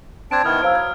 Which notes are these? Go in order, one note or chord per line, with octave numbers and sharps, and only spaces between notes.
C4 D4 A5 G#6 D7
D#3 B3 E4 D#6 F6
F#3 C5 F5 E6 D7
G#6